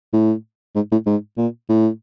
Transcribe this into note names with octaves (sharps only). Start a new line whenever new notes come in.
A2
G#2
A2
G#2
A#2
A2